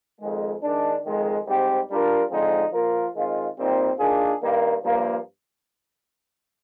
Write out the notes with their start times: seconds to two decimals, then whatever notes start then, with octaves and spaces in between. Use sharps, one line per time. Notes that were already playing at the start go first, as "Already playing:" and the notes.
0.20 F2 D#3 G#3
0.62 D#3 G#3 D4
1.05 F2 D#3 G#3
1.47 G#2 G3 C4 G4
1.89 G3 D4 F4 A#4
2.31 D3 F3 G#3 C4 D#4
2.72 F3 A#3 F4 A#4
3.15 D#3 G#3 C4 F4
3.56 A#2 G3 C4 D#4
3.99 D#3 A#3 D4 F4 G#4
4.41 G2 D#3 A#3
4.83 G2 F3 A#3